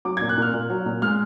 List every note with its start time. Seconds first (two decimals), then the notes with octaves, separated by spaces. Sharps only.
0.05 F#3 D6
0.17 A#2 G#6
0.29 F#6
0.37 A#2 F6
0.53 A#2
0.70 F#3
0.86 A#2
1.02 G#3 F6